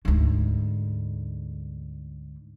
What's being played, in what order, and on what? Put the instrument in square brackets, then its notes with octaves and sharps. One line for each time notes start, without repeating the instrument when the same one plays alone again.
[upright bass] D2 G#2